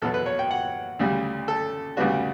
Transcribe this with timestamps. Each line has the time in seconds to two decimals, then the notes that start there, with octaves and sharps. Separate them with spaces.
0.02 E2 B2 F#3 B3 A4
0.14 B4
0.26 C#5
0.39 G5
0.51 F#5
0.99 D2 C#3 G3
1.48 A4
1.97 D2 C#3 G3 B3 D4 F#4